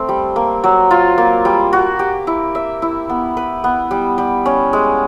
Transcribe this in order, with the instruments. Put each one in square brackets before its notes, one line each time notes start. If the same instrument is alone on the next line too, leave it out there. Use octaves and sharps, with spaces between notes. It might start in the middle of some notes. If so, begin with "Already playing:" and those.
Already playing: [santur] A3 C4
G3
A#3
F#3
F4
A#3
G3
F#4
G4
E4
E5
E4
B3
B4
B3
G3
G3
C#4
G#3